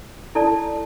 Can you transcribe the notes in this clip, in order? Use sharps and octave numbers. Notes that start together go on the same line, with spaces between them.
E4 A4 D5 A5